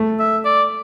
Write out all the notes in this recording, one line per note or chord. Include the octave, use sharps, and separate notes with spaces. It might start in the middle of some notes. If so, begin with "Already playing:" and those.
Already playing: A3
E5
D5